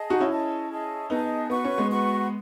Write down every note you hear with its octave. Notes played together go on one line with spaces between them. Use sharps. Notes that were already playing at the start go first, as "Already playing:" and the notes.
Already playing: G#4 D#5 A5
D#4 F#4
C#4 E4
G#4 D#5 A5
G#4 D#5 A5
B3 D#4 G#4 D#5 A5
B3 F#4 B4 F#5 C#6
C#4
G#3 B3
F#4 B4 F#5 C#6